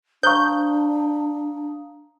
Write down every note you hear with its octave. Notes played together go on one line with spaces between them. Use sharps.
D4 C5 F5 A#5 C#6 D#6 G6